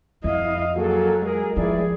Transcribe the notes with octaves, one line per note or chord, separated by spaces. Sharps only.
F2 E4 D#5 F5
F#3 A#3 F#4 G#4 A4
G#3 G#4 A#4
G2 F3 E4 G#4 D5